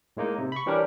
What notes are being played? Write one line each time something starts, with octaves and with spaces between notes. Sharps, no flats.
A2 G#3 A#3 D#4
C3
B5 C#6
E3 G3 C#4 D4 G4 A#4